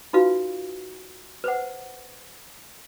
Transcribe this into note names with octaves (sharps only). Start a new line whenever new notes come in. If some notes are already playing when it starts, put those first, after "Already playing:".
D#4 F4 F#4 B4 F5
B4 C5 F#5